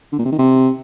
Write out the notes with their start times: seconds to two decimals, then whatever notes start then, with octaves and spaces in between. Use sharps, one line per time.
0.12 D3
0.19 A#2
0.25 C3
0.32 D#3
0.39 C3